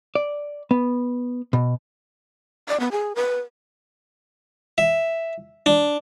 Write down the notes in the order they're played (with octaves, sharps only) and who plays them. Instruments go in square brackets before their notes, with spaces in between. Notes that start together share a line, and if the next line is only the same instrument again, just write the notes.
[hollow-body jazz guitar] D5
B3
B2
[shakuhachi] D5
B3
G#4
B4
[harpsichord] E5
D4